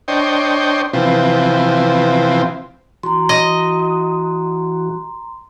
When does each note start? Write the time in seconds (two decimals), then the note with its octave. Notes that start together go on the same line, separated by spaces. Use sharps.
0.08 D4 C5 C#5 D#5 G5
0.93 C3 E3 F3 B3 C4
3.03 E3 F#4 A#5 C6
3.29 D#5